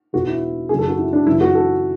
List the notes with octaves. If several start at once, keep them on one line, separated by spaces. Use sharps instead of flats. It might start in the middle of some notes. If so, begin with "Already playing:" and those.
E2 B2 F#4
E4
F#2 C#3 E3 G#4
A4
F#4
E4
D4
F#2 C#3 E3 E4
F#4
A4